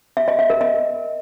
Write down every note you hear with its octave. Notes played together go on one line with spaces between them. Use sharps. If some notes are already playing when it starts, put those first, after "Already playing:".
E5
D#5
E5
A#4
D#5